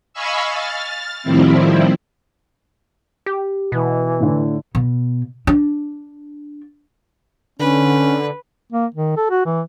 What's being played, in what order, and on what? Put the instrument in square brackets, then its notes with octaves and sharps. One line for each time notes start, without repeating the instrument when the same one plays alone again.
[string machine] D#5 F5 G#5 B5 C#6 E6
F6 A6
A2 D#3 F3 G3 C4 E4
[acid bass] G4
[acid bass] B2 [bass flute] E3
[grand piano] A2 D3
[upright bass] B2
D4
[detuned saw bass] D3 [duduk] C#4 [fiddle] B4
[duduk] A#3
D#3
A4
F#4
E3